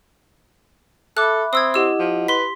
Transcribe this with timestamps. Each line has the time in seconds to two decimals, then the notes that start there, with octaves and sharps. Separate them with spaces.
1.17 A4 E5 B5 D6 F#6
1.53 C4 D#6 E6 G#6
1.74 E4 G4 D#5 F#5 E6
1.99 F3
2.28 B4 C6 B6